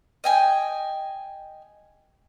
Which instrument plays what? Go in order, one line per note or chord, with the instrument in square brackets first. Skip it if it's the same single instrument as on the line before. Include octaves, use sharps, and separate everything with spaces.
[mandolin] D#5 G5 G#5